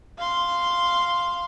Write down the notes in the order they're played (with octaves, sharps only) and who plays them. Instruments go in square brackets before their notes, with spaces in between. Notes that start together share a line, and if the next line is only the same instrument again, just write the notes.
[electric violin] F5 C6